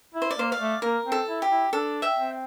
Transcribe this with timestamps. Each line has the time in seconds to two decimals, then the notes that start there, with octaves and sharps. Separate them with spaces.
0.15 E4
0.22 C5
0.31 D5
0.37 A#3 C5
0.52 D5 F5
0.59 A3
0.82 A#3 A#4
1.05 C4
1.12 A4
1.28 E4
1.42 G4
1.50 E4
1.73 D4 A4
2.02 E5 G5
2.18 C4